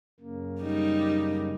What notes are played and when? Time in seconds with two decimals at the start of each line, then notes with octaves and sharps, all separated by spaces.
0.20 F#2 C#3 A#3
0.61 G3 D#4